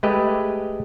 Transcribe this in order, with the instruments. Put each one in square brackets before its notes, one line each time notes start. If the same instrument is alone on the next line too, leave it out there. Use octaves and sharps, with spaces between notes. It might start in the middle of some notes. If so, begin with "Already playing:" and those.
[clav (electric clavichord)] G#3 A3 G4 B4 D#5